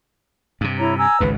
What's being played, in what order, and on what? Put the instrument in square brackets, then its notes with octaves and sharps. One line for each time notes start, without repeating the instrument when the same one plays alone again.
[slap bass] G2 C3
[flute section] E4 C#5 A#5
G#5 A#5 E6
[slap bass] G#1 C#2 G#2 [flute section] B4